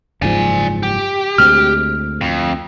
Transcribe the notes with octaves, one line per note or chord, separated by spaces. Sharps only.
F#1 G#2 F3 D5 G#5
G4
D2 G#3 C4 F6
F2